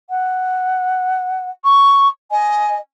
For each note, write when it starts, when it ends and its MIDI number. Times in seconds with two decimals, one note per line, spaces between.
0.10 1.50 78
1.64 2.08 85
2.31 2.77 75
2.31 2.75 80